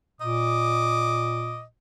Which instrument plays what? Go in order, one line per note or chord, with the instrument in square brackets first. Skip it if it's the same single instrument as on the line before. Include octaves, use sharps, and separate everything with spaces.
[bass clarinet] A#2 [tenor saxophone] D#5 [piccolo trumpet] D6